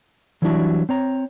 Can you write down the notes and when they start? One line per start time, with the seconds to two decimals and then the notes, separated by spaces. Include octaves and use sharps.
0.42 E3 F#3 G3 D4 E4 F#4
0.89 C4 C#5 A#5